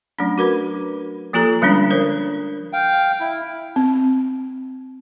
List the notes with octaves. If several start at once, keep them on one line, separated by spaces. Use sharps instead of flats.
F#3 A3 C#4 D4
F#4 A#4 B4 B5
F3 A#3 F4 G4 A4 A#5
D3 F3 G3 G#3 C#4 D4
F3 A#4 C5
F5 G5
E4
C4